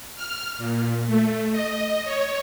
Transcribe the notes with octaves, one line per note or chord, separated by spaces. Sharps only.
F6
A#2
A3
D#5
C#5